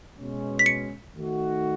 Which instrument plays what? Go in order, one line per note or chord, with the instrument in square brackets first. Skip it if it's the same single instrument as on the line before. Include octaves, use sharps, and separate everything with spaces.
[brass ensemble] B2 G#3 C#4
[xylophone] B6
C#7
[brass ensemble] D#3 A3 D#4 F#4